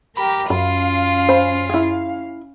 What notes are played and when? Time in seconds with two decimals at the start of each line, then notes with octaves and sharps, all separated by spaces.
0.17 G4 A#4 B5
0.50 F#2 C#4 F4 F5 B5
1.29 C5 G#5 B5
1.69 E4 G#4